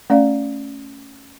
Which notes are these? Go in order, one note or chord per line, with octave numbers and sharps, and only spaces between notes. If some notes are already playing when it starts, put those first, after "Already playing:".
A3 C#4 D5 F5